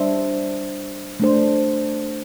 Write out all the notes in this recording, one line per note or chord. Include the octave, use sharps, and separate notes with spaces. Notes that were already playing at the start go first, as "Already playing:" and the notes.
Already playing: G3 D4 C5 E5
A3 D4 C5